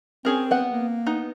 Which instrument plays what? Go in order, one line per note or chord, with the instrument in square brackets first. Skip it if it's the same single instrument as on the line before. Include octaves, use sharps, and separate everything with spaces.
[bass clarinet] C4 [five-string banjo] C#4 G#4 A#4
[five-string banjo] B3 F#5
[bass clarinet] A#3
[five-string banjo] B3 D#4